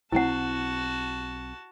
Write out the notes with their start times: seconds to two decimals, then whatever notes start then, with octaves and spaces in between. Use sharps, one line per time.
0.12 B1 F#3 C4 E4 F#4 F#5 A5